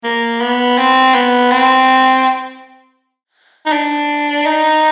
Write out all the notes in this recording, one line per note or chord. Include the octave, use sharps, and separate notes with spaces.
A#3
B3
C4
B3
C4
D#4
D4
D#4